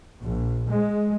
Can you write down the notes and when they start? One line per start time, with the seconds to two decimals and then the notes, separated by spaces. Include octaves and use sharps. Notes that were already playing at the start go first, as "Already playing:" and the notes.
0.22 A#1
0.70 G#3